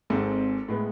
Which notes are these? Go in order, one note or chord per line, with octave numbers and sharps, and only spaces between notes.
G#1 G#2 G#3 C4 A4
A2 G#3 B3